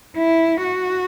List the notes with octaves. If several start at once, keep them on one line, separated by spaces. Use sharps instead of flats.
E4
F#4